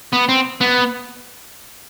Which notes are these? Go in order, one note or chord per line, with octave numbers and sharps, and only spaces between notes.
B3
C4
B3